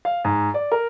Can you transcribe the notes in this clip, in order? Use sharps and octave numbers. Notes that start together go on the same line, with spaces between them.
F5
G#2
D5
A#4